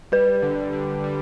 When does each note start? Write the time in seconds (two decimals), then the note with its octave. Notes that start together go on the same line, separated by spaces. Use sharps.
0.12 G3 B4
0.42 D3
0.73 D3
1.04 G3